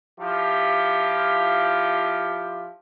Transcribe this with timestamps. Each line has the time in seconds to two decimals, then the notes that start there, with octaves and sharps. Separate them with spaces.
0.20 F3 E4 F4 G4